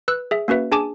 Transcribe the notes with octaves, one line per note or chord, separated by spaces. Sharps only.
B4 E6 F#6
G#4 E5
A#3 C#4 F#4 B4 E5
D4 G#4 G#5 A5 D6